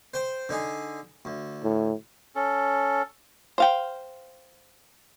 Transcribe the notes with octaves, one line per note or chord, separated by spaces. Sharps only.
C5 G5 C6
D3 D#4 G#4
D2
A2
C#4 A4
C5 F5 G5